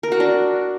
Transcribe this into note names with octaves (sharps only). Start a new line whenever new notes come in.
A#4
F#4
D4